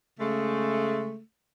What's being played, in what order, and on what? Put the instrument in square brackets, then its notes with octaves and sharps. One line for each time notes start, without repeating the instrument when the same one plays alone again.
[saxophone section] C#3 G#3 A3